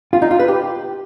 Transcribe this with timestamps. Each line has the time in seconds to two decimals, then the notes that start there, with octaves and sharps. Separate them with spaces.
0.13 F4
0.22 D#4
0.31 F4
0.39 B4
0.48 G4